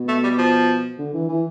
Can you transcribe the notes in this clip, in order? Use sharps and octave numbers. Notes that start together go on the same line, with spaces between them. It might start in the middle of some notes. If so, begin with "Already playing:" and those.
Already playing: B2
A3
G3
F3
D3
E3
E3